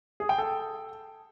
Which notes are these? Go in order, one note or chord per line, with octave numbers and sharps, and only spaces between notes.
G#4
G5
A4